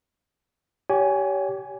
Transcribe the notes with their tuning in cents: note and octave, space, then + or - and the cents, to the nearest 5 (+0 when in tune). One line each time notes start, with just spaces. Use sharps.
G4 -20 C#5 +30 G#5 +0